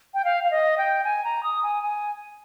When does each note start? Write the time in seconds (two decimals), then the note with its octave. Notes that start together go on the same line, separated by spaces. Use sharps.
0.14 G5
0.25 F5
0.44 F5
0.51 D#5
0.78 G5
1.04 G#5
1.24 A#5
1.43 D#6
1.63 G#5
1.83 G#5